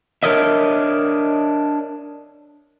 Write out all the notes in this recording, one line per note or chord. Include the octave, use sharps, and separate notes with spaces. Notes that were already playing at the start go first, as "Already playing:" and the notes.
D4 A#4 C#5 D#5 E5